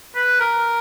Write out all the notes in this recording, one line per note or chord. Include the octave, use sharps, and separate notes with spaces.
B4
A#4